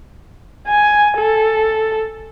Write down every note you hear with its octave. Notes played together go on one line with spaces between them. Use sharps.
G#5
A4